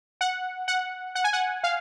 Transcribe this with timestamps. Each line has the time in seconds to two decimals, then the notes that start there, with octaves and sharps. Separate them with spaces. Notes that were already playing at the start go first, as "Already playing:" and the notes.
0.21 F#5
0.68 F#5
1.15 F#5
1.24 G#5
1.33 F#5
1.64 F5